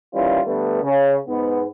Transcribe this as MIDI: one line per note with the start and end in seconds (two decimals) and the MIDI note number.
0.14 0.39 51
0.14 0.39 52
0.14 0.39 55
0.14 0.39 61
0.14 0.39 64
0.14 0.39 65
0.46 0.82 50
0.46 0.82 55
0.46 0.82 57
0.46 0.82 59
0.83 1.17 49
1.28 1.65 44
1.28 1.65 59